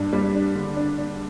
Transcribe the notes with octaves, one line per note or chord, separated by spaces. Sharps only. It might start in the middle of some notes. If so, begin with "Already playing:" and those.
Already playing: G2 D4
G3
D4
D3
D4
D4